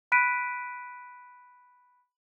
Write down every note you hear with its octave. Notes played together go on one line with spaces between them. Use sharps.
B5 F#6 B6 D7 D#7